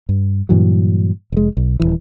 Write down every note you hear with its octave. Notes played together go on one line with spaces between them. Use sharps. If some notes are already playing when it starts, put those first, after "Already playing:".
G2
G2 A#2 E3 F#3
F1 G#3
B1
D#1 B1 E3